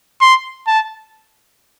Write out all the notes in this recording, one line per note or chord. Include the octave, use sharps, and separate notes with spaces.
C6
A5